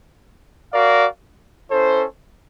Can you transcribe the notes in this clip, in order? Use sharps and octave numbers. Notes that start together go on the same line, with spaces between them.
F#4 A#4 D5 F5
C#4 E4 A4 C5